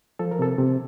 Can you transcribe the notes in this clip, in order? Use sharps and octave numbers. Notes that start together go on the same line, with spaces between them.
F3 A4
A#4
C3 A4
C3